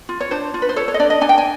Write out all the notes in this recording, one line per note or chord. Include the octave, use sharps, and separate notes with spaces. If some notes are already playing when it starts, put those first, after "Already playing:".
F4
C#5
D4 C5
F4
B4
C5
A4 C#5
C#5
D#5
D4 D5
D#5
D4 G#5
G5
G#5